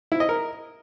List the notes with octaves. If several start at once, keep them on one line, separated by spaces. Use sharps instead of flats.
E4
D#5
A#4